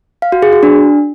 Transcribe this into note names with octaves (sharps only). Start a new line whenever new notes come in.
F5
F#4
G#4
F#4
D4